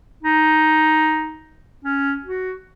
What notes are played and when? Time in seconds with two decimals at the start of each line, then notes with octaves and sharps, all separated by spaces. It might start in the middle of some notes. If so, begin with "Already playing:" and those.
0.23 D#4
1.85 C#4
2.24 F#4